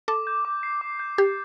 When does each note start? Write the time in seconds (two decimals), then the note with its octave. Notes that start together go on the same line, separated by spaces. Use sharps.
0.08 A4 D6
0.27 G6
0.45 D6
0.63 C7
0.81 D6
0.99 G6
1.18 G4 A6